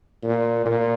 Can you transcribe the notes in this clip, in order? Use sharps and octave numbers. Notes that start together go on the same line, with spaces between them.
A#2
A#2